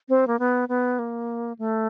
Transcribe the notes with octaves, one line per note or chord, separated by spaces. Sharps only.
C4
A#3
B3
B3
A#3
A3